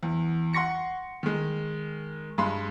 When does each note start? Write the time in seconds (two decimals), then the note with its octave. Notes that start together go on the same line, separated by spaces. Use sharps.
0.03 E2
0.53 F#5 C6 C#6 A#6 C#7
1.23 D#3 G#3
2.38 G2 G#3 B5 C6